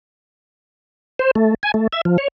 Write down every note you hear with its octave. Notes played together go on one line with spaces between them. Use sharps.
C5
A3
G#5
A3
E5
F3
C#5